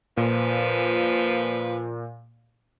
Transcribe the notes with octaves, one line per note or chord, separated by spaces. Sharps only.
A#2 F3 B4